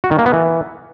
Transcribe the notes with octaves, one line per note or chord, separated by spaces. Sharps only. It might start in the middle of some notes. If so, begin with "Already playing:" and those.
F#4
D#3
A#3
B3
E3